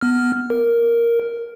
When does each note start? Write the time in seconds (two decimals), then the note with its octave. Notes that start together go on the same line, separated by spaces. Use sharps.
0.01 B3 F6
0.50 A#4